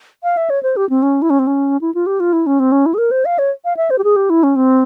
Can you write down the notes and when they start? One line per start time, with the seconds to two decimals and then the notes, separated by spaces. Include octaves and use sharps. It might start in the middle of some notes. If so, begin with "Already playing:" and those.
0.23 F5
0.37 E5
0.50 C#5
0.63 C5
0.76 G4
0.90 C4
1.02 C#4
1.22 E4
1.30 C#4
1.39 C4
1.47 C#4
1.81 E4
1.94 F4
2.06 G4
2.20 F4
2.33 E4
2.46 C#4
2.60 C4
2.72 C#4
2.86 E4
2.94 G#4
2.98 A#4
3.11 C5
3.25 F5
3.38 C#5
3.65 F5
3.77 E5
3.90 C5
3.98 G4
4.04 G#4
4.16 G4
4.30 E4
4.43 C#4
4.56 C4